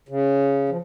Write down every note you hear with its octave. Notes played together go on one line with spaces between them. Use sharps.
C#3
F3